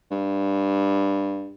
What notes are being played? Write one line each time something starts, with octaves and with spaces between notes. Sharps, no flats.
G2